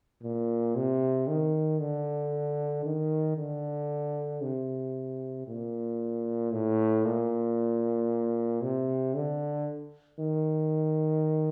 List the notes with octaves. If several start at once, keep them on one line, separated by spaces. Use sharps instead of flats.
A#2
C3
D#3
D3
D#3
D3
C3
A#2
A2
A#2
C3
D3
D#3